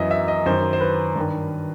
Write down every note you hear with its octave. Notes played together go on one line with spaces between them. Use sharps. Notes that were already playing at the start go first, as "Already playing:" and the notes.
Already playing: F#2 E3 D#5 E5
E5
D#5
F#2 D#3 C5
C5
B4
G2 D#3